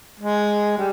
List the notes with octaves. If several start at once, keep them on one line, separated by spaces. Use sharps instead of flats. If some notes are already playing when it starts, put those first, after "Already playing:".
G#3
G3